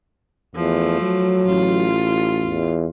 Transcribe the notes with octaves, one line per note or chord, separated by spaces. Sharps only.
E2 F3 A3
F#3
A1 F4
E2